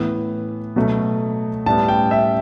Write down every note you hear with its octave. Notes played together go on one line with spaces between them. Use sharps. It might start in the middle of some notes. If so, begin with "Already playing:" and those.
Already playing: A2 E3 B3
B2 F#3 A3
A2 G3 B3 A5
G5
E5